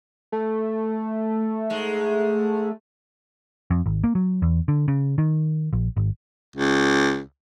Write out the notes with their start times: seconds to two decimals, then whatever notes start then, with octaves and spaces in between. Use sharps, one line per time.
0.32 A3
1.70 G#2 G#3
3.71 F2
3.86 G#1
4.04 A#3
4.15 F#3
4.42 E2
4.68 D3
4.88 C#3
5.18 D#3
5.73 A#1
5.97 G#1
6.56 C#2